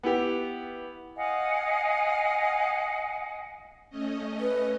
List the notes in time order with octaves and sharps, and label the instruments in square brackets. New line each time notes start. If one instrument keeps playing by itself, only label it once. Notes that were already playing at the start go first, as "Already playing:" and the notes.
[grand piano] B3 E4 G4
[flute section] D#5 F5 F#5 G#5
[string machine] A3 C#4 D#5
[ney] B4